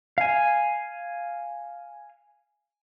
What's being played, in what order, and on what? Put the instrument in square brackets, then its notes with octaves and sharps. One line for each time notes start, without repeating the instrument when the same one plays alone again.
[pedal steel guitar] F5 G#5